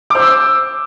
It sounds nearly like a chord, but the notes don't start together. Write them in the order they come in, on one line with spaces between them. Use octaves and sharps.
D6 C5 E6